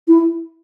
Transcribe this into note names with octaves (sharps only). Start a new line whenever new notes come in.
E4